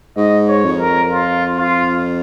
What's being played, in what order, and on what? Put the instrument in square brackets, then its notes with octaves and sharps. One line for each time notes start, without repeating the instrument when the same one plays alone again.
[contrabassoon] G#2 [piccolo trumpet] D#5
[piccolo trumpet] C#5
[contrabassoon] F2
[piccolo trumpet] A#4
F4
F4